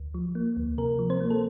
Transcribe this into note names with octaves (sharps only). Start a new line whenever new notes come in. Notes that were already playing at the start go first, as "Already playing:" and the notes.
Already playing: D2
F3
A#3
D2
C3 A#4
F3
C4 C5
A#3
A4